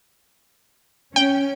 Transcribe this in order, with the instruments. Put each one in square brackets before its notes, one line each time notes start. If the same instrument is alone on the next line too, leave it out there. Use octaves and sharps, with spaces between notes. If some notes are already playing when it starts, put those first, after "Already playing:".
[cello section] C#4 [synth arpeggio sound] G5